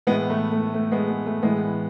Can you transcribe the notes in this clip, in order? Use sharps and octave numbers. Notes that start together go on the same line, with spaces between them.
A2 E3 G#3 B3
A3
A3
A3
G#3 B3
G#3
A3
A2 E3 G#3 B3